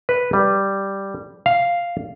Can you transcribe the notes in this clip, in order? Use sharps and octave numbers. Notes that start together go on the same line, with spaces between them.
B4
G3
F5